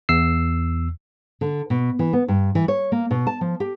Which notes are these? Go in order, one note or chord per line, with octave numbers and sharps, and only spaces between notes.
E2 E6 C7
D3
B2
E3
B3
G2
E3
C#5
A#3
B2
A5
F3
G4